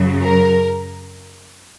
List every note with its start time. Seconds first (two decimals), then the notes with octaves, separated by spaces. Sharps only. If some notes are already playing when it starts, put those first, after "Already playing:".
Already playing: F#2 C#3 F#3
0.21 A#4